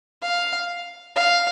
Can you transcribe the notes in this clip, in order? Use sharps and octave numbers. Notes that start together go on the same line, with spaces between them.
F5
F5